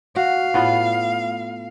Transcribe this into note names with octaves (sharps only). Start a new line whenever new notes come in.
F#4 F5
A2 B3 F4